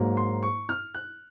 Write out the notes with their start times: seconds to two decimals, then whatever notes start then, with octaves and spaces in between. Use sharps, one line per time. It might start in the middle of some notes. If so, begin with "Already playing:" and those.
Already playing: G#2 F#3 A#3
0.17 C6
0.43 C#6
0.69 F6
0.94 F#6